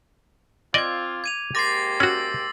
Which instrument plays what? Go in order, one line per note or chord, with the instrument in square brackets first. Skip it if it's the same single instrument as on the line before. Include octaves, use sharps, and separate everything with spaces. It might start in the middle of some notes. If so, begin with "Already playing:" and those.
[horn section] C4 F4 [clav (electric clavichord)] D5 D#5 [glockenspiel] D6 G#6
[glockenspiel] G#6 D#7 F7
[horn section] G#2 A#3 G4 [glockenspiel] C6 D6 A#6 [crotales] A6 C7
[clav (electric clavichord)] C#4 F#4 [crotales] E6